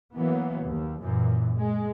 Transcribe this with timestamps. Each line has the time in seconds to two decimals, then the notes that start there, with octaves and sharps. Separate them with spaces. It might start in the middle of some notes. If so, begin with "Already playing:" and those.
0.15 E3 F#3 A#3 B3
0.63 D#2
1.00 F#2 A#2 E3
1.55 G#3